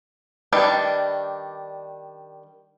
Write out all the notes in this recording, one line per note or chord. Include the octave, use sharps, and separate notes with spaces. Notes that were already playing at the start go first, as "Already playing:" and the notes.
D#3 G3 D4 B4